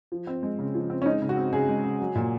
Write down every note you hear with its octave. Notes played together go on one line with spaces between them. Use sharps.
F3
C4
G#3
C#3
F3
C4
C#4
G#3 D#4
C#3
F#4
C4
C#3 G#4
G#3
C#3
F#3
A#2